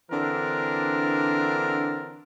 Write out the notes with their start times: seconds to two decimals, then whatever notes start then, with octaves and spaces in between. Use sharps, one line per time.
0.11 D3 E3 C4 D4 A#4